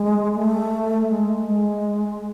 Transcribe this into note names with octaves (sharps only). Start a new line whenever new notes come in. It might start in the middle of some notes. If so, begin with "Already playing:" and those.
Already playing: G#3
A3
G#3
G#3